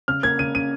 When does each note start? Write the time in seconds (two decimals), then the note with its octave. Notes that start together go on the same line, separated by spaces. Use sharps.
0.08 C#3 F6
0.23 A#3 G#6
0.39 C#3 D#7
0.54 C#4 D#7